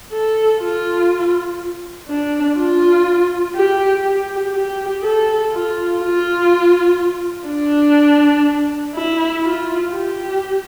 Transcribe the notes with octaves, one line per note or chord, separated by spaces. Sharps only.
A4
F4
D4
F4
G4
G4
G4
A4
F4
F4
D4
E4
F4
G4